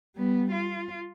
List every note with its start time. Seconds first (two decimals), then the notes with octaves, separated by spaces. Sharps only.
0.16 G3 B3
0.52 F4